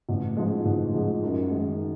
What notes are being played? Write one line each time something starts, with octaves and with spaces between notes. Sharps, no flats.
A1
G#2 F3 G#3
A1
G#2 F3 G#3
F#2
D#3 G#3